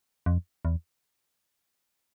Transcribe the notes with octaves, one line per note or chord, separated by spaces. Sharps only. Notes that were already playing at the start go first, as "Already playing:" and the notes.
F2
E2